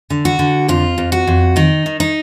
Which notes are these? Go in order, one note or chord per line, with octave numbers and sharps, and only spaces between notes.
D3
F#4
D3
F2 F4
F2
F#4
F2
D#3 D#4
D#3
D#4